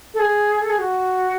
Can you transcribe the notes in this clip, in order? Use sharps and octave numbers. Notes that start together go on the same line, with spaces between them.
A4
G#4
A4
G#4
F#4